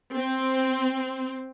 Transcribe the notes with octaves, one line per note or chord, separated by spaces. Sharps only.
C4